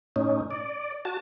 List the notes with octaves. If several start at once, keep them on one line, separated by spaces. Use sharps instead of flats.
A2 C#4 D#4
D5
F#4 A5